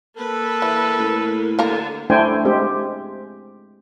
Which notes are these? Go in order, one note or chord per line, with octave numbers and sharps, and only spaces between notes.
A#3 A4 B4
E3
A2
D3 A#3 A#4 A#5
A3 D4 E4 C5 G5 G#5
G#3 C4 G4